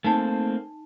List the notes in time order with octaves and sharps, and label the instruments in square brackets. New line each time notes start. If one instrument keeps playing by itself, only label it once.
[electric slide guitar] A3 A#3 C4 [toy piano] D#4 G#5 A5